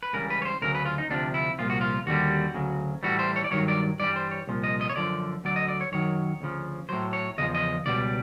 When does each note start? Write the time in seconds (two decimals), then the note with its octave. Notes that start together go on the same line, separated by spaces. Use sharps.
0.03 B4
0.13 C#2 C#3 E3 G3 A#4
0.30 B4
0.42 C#5
0.45 C5
0.62 D2 C#3 F#3 A#4
0.75 B4
0.86 F4
0.98 D#4
1.10 D2 C3 F3 D4
1.34 E4
1.58 C2 A#2 F3 F4
1.70 F#4
1.81 F4
2.06 D#2 D3 G3 F#4
2.54 D2 C#3 F#3
3.03 A2 E3 G3 F#4
3.19 C5
3.36 C#5
3.44 D5
3.51 G2 D#3 F#3 C#5
3.68 D5
4.00 G2 E3 G3 D5
4.16 C5
4.31 C#5
4.47 C2 A#2 F3
4.64 D#5
4.81 D#5
4.89 C#5
4.96 F#2 D3 F3 D5
5.44 D2 D3 F#3 D5
5.56 D#5
5.68 D5
5.81 C#5
5.92 F#2 D#3 F#3 C#5
6.41 D2 C#3 F3
6.89 A2 F#3 C5
7.13 C#5
7.38 E2 C#3 F3 D#5
7.55 D#5
7.86 C#2 B2 G3 D5